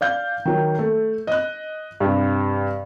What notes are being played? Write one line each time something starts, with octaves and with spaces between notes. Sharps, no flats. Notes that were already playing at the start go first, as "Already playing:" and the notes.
D5 F5 G6
D#3 F#3
A3
D#5 F#6
G2 C3